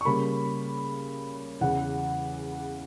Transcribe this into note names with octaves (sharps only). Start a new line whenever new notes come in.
C#6
C#3 G3 A#3 B5
E2 C#3 E3 F#5